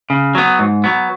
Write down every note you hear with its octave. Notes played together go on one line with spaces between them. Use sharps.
C#3
F#3 B3
G#2
F#3 B3